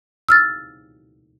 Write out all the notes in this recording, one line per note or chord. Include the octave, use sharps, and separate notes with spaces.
E6 F6 A6